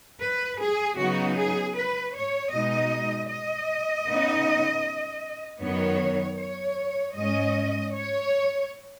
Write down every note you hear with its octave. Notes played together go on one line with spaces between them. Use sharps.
B4
G#4
C#3 F#3 B3 D#4 F#4
G#4
B4
C#5
B2 G#3 D#4 D#5
D#5
C#3 B3 D#4
F#2 D#3 B3 C#5
C#5
G#2 G#3 C#4 D#5
C#5